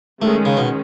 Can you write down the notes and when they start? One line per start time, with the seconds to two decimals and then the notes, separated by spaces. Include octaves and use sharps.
0.22 D#3 G#3 A3 C#4
0.45 C#3
0.57 B2